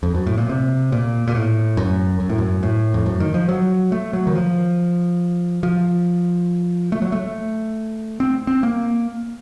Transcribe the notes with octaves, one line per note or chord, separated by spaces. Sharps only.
F2
F#2
A2
A#2
C3
A#2
A#2
A2
F#2
F#2
A2
F#2
A2
F2
F#2
D#3
F3
F#3
A3
F#3
D#3
F3
F3
A3
F#3
A3
C4
C4
A#3